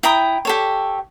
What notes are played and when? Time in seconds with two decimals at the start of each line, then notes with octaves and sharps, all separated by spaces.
0.03 E4 G5 A#5 D#6
0.45 G4 A4 C#5